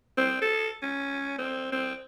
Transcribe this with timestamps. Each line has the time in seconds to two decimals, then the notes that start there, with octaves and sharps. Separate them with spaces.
0.18 C4
0.42 A4
0.82 C#4
1.38 C4
1.73 C4